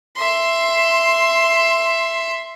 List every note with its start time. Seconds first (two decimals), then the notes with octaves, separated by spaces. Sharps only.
0.16 E5 C6